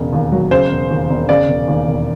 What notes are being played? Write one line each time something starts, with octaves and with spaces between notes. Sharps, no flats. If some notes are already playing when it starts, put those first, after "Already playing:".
Already playing: E1 C#3
D#2
F#3
C#3 C5
E1
D#2
E1
C#3 D5
E1
D#2
E1